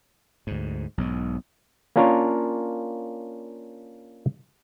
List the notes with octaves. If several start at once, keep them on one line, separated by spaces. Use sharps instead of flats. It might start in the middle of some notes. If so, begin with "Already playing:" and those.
D2 G#2
B1 G#2
A#3 C#4 D4 F4 A#4 C#5